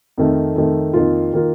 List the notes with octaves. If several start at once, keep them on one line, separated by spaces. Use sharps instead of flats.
F2 D#3 A3
F2 D#3 A3
F2 D#3 A#3 F4
D#3 A#3 F4